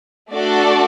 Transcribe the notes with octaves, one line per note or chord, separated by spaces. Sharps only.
A3 D4 F#4 A4 D5